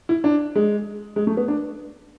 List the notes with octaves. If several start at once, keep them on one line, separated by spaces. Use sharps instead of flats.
E4
D4
G#3
G#3
A3
B3
D4